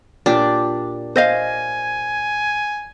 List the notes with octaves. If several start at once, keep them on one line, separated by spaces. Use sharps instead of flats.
A#2 D4 G4
C5 D#5 F5 G#5